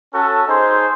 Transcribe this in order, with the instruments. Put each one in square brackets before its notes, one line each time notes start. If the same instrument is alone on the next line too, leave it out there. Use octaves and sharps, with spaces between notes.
[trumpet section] C#4 F#4 A4
D#4 G#4 C5 C6